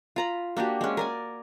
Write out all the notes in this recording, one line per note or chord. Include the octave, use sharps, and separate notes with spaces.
F4 A#5 B5
A#3 D4 F#4 G4
G#3 C#4
A#4 D5 G#5